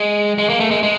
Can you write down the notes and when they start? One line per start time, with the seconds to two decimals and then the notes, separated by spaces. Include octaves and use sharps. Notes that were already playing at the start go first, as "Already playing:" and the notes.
Already playing: G#3
0.38 G#3
0.49 A#3
0.60 A3
0.71 G#3
0.83 G#3